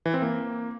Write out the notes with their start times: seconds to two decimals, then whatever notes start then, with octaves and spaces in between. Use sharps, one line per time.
0.06 E3
0.14 C4
0.22 A#3